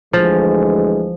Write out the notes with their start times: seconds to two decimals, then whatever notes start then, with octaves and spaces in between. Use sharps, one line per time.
0.13 D2 E3 F3 G#3